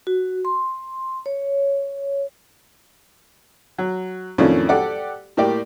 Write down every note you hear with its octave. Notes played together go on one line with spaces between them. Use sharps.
F#4
C6
C#5
F#3
F2 A2 D#3 A3 C#4 D4
G4 A4 D5 F#5
A2 A#3 G4 D5